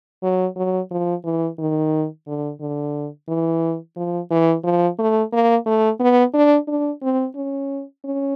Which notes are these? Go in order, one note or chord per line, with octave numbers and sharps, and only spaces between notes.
F#3
F#3
F3
E3
D#3
D3
D3
E3
F3
E3
F3
A3
A#3
A3
B3
D4
D4
C4
C#4
C#4